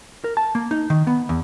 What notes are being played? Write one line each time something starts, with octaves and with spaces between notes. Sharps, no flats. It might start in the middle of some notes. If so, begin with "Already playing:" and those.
A#4
A5
A#3
D#4
D#3
B3
E2